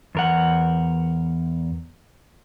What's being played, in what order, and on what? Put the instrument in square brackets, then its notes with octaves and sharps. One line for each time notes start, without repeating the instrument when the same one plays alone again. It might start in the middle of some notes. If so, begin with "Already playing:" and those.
[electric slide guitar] E2 A#4 F#5